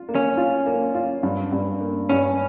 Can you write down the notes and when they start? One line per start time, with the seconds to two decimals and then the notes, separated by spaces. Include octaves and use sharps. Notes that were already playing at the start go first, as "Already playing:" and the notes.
Already playing: F4
0.09 A#3
0.15 C#4
0.37 F4
0.66 A#3
0.95 F4
1.23 G2
1.52 G2
1.80 A#3
2.09 G2 C#4